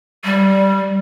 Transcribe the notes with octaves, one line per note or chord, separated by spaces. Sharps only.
G3